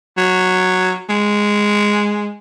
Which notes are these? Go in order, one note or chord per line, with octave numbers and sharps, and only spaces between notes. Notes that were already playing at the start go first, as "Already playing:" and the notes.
F#3
G#3